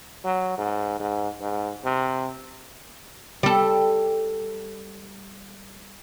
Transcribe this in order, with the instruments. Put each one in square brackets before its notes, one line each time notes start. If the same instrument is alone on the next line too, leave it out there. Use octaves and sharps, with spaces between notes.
[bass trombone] F#3
G#2
G#2
G#2
C3
[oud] G3 A4